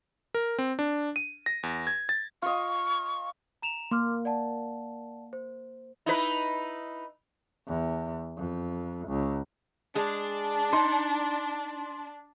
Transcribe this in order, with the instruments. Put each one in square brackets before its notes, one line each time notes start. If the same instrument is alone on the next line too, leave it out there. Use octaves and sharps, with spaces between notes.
[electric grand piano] A#4
C4
D4
D#7
A#6
E2
G#6
A6
[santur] F4 D#5 [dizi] C#6
[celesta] A#5 E7 F7
[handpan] A#3 [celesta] C6 D6 F6
[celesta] D5 F#5 A5
C5
[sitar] D#4 E4 B4
[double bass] E2
F2
C#2
[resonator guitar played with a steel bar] G#3 G#4 [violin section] D4
[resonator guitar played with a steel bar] D#4 [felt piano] C6